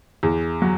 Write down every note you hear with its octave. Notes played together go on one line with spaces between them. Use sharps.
E2
F#3